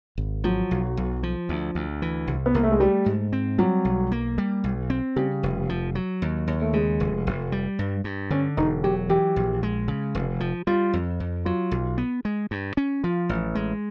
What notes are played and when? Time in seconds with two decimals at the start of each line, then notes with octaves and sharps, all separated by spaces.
0.18 G#1
0.44 F3 F#3
0.71 B1
0.97 B1
1.23 F3
1.49 D2
1.75 D2
2.02 E3
2.27 C2
2.46 B3
2.54 C2 A#3
2.63 A3
2.72 G#3
2.80 G3 A3
3.06 G#2
3.33 C4
3.58 F#3 G3
3.85 B1
4.12 A#3
4.38 G3
4.64 B1
4.90 C4
5.16 C#3 G3
5.43 F1
5.69 F3
5.95 F#3
6.22 D#2
6.47 D#2
6.62 A3
6.73 C#3 G#3
7.00 F1
7.27 F1
7.52 G3
7.79 G2
8.04 G2
8.31 D3 C#4
8.57 E1 D#4
8.84 F#3 G4
9.09 E3 G4
9.36 A#1
9.63 G#3
9.88 C#3
10.15 F1
10.40 F3
10.67 G3 F4
10.93 F2
11.20 F2
11.45 F#3 F4
11.71 B1
11.98 B3
12.25 G#3
12.51 G2
12.77 C#4
13.03 F3 F4
13.29 A1
13.55 G#3